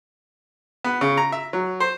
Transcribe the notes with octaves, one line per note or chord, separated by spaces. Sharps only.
B3
C#3
A#5
E5
F#3
C5